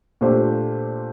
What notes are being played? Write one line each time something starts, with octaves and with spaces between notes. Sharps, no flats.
A#2 A3 D4 G4 C5